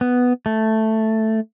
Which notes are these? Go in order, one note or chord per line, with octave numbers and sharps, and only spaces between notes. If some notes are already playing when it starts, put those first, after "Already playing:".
B3
A3